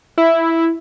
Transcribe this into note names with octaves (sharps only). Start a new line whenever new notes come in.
E4